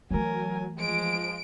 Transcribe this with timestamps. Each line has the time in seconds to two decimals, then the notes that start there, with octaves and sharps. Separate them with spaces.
0.11 E3 F#3 A3 A#4 G#5
0.79 F3 G#3 D7